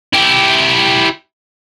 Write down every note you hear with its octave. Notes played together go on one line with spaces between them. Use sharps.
E4 G4